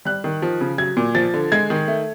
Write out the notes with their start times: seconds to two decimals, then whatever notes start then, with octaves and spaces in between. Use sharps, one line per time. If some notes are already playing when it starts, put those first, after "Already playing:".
0.05 G3 F#6
0.24 D#3
0.42 F3
0.61 C#3
0.78 F#3 G#6
0.97 A#2
1.15 F3 A6
1.34 D3
1.52 G#3 G#6
1.70 D#3
1.88 A3